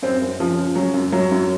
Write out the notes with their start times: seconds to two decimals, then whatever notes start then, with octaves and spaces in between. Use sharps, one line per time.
0.02 F#2 C4
0.22 F#2
0.39 C#3 F3
0.58 C#3
0.75 C#3 F#3
0.94 F#2
1.12 F#2 F#3
1.31 F#2